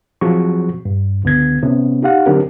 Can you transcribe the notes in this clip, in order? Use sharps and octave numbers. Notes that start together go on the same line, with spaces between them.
F3 F#3 C4 F#4 G#4 C#6
G2
C#2 D3 B3 G#6
C3 B3 C#4
D#4 G4 F5 F#5
D3 F#3 C4 D4 G4 A#4